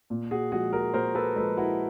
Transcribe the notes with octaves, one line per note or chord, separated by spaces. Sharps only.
A#2
F#4 G#4
F3 G#3 F#4 G#4
G#4 A#4
A#2 A#4 C5
A4 B4
F3 G#3 A4 B4
E4 F#4